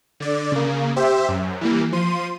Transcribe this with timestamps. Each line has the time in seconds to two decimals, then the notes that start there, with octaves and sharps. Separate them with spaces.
0.20 D3 D5
0.52 C#3 A#3
0.96 G4 C5 E5
1.28 F#2
1.61 E3 G3 A#3
1.92 F3 C6 D#7